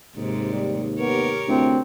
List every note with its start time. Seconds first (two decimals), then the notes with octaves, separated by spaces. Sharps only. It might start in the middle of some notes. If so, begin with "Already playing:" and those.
0.16 D#2 G#2 C3
0.51 G3
0.99 B3 G4 A#4 C#5
1.48 D2 C4 E4